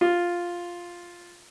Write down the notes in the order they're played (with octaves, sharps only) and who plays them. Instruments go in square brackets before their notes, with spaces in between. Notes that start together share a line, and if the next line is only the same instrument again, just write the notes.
[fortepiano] F4